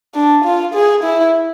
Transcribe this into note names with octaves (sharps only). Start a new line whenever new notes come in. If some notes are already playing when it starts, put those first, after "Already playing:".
D4
F4
G#4
E4